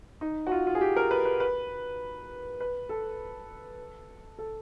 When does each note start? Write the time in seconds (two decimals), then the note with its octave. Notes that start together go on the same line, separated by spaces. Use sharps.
0.21 D#4
0.47 F#4
0.51 F4
0.67 F4
0.75 G#4
0.81 G4
0.96 A#4
1.11 B4
1.25 B4
1.40 B4
2.60 B4
2.89 A4
4.38 A4